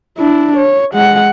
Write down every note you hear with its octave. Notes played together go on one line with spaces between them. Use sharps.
D4 E4
C#5
G#3 F#5